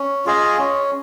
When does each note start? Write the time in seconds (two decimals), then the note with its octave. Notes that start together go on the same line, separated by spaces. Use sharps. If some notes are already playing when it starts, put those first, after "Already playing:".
Already playing: C#4
0.25 F4 G#4 D#5
0.58 C#4